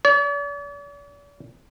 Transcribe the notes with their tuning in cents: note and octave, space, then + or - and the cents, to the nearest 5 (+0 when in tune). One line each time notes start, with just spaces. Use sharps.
D5 -45